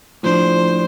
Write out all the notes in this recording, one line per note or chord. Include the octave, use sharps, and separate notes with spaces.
A2 F3 D4 C5